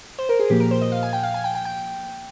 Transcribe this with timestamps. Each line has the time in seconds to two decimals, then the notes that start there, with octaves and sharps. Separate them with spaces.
0.19 C5
0.29 A#4
0.40 G#4
0.50 A#2 F3 A#3 G4
0.60 A#4
0.71 C5
0.81 D#5
0.92 F5
1.03 G#5
1.13 G5
1.23 F5
1.34 G#5
1.44 G5
1.55 G5
1.65 G5